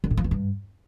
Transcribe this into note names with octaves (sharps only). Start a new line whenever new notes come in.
D3
A2
F3
E2
G2